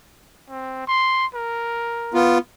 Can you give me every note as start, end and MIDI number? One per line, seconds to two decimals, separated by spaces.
0.50 0.87 60
0.88 1.26 84
1.34 2.24 70
2.14 2.38 59
2.14 2.38 65